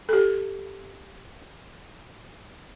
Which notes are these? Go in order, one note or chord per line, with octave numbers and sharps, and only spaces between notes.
G4 A4